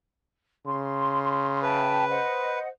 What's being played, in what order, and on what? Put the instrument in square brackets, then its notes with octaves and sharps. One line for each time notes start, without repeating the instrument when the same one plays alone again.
[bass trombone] C#3 [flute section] C6
[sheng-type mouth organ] B4 [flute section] E5 G5 A5
[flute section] C5 D#5 F#5